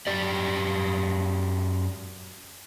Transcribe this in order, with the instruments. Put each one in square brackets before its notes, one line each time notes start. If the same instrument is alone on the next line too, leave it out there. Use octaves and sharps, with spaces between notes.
[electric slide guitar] F#2 G4 D5